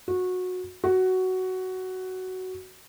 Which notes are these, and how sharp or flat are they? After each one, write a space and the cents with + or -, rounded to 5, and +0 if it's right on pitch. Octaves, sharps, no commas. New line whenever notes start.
F#4 -20
F#4 +10